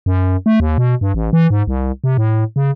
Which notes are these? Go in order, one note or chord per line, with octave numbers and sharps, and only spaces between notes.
F#2
A3
D#2
B2
G2
A1
E3
G#2
C2
C3
A2
C#3